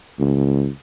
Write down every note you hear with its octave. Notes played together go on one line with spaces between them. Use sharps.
C#2